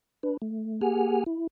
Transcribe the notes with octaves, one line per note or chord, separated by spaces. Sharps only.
D4 B4
A3
A#3 G4 G#4 F#5 G#5 F6
E4